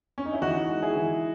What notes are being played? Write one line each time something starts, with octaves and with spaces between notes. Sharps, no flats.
C#4
D#4
E4
E3 D#4 F#4
G#3
E4 G#4
E3